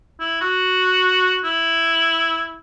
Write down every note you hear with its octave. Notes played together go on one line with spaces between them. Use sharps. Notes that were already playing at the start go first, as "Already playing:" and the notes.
E4
F#4
E4